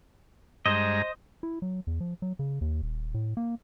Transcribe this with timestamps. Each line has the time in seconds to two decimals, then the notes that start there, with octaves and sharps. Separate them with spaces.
0.66 G2 G#3 C5 D#5 A#5
1.43 E4
1.62 F#3
1.87 E2
2.00 F3
2.22 F#3
2.39 C#3
2.61 D#2
2.82 D#1
3.14 A2
3.37 A#3